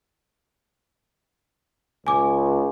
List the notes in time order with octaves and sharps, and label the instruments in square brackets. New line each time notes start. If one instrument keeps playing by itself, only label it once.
[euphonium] C#2 [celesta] G#5 D6